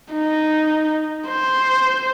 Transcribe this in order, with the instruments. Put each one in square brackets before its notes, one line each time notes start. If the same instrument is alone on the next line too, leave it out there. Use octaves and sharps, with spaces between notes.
[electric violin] D#4
C5